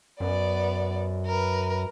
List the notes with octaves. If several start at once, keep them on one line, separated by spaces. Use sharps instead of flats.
F#2 B3 D5
A#4 B4